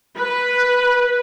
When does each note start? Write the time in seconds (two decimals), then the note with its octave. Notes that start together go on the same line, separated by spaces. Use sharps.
0.17 B4